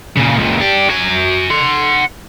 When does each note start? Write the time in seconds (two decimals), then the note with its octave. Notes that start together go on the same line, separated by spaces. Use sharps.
0.17 A#2 C#3
0.36 C#2 A#2
0.60 D4 G4
0.90 F#4 G#5
1.50 F#5 C6